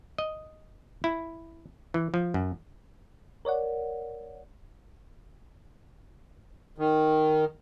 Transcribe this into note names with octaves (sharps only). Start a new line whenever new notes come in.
D#5
E4
E3
F3
F#2
A#4 C#5 D5 F#5
D#3